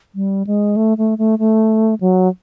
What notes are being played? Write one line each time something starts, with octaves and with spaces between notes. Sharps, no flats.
G3
G#3
A3
A3
A3
A3
F#3